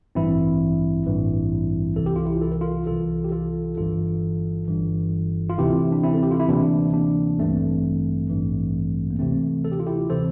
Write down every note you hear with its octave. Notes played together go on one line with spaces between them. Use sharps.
A1 G2 E3 C4 E4
A1 G2 E3
C2 C3 E3 A4
G4
F4
E4 G4
A4
A#4
F4 A4
C2 C3 E3 F4 A4
G4
F4 A4
G1 G2 E3 F4 A4
G1 G2 E3
F4
D2 C3 E3 E4 G4
D4
C4 E4
A4
G4
F4
E4
D2 C3 E3 A#3 D4
A#3 D4
A1 G2 E3 A3 C4
A1 G2 E3
A#3
D2 C3 E3 A3 C4
A4
G4
F4
E4 G4
C3 E3 A4 C5